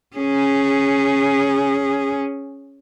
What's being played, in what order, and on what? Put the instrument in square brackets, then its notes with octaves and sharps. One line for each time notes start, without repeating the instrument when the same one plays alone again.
[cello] C#4 G#4